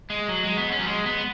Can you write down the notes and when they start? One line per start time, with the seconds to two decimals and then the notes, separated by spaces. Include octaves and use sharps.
0.10 G#3
0.28 F#3
0.43 G#3
0.57 B3
0.72 C#4
0.79 F#3
0.85 G#3
1.05 B3